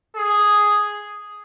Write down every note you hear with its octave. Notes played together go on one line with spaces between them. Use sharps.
G#4